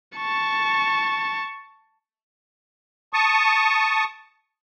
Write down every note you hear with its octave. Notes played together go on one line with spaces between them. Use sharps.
A5 C#6
A5 C#6 D#6